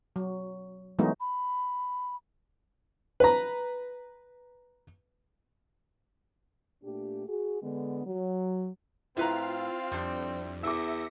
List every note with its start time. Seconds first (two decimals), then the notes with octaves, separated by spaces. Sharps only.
0.16 F#3
0.99 E3 F#3 G#3 A3 B3 D#4
1.20 B5
3.20 B4 A#5
6.84 A#2 A3 D4 G4
7.28 F#4 G#4
7.62 D3 G#3 B3
8.06 F#3
9.17 A2 C4 E4 F4 B4 F5 A#5
9.92 F2 F3 G3 D4
10.63 E2 E5 D6 E6 A#6 C#7